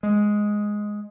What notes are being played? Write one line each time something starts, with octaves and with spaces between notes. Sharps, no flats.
G#3